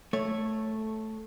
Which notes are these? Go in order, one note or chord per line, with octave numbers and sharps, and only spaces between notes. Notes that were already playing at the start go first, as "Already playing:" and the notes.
A3 C#5